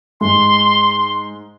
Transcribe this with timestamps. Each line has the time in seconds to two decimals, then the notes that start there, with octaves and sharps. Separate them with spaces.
0.21 G#2 G#3 C6